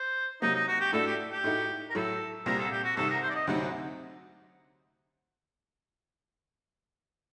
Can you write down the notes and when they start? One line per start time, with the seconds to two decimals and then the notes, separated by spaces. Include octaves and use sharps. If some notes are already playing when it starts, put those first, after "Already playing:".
Already playing: C5
0.42 C3 F#3 A#3 D#4
0.55 D#4
0.68 F#4
0.80 G4
0.93 A2 A3 D4 F#4 A4
1.06 G4
1.31 G4
1.44 A2 A3 D#4 F#4
1.90 A#4
1.95 A2 F#3 A3 A4
2.46 C2 A#2 G3 C4 A#4
2.58 A4
2.71 G4
2.84 F#4
2.96 C2 C3 D#3 A4
3.09 A#4
3.22 C5
3.30 D5
3.35 D#5
3.47 D2 C3 F#3 C4 D#4 F#5